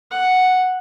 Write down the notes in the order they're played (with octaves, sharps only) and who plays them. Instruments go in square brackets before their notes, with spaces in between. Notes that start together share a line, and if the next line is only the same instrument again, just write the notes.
[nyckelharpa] F#5